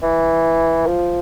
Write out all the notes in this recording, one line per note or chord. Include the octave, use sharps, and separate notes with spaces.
E3
F3